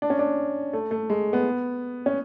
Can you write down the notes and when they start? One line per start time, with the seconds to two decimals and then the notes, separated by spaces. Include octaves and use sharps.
0.02 D4
0.10 C#4
0.19 D4
0.73 A3
0.91 A3
1.10 G#3
1.33 B3
2.06 C#4